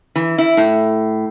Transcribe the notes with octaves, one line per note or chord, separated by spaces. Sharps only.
E3
E4
A2